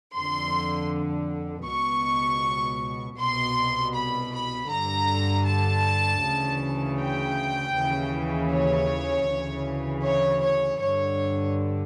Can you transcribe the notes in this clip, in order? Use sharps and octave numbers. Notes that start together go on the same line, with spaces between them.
F2 D3 C6
C#2 B2 C#6
C2 B2 C6
B5
B5
G2 D3 A#5
A5
D2 C#3 E3
G5
D#2 C#3 E3
C#5
D2 C#3 E3
C#5
C#5
G2 D3 C#5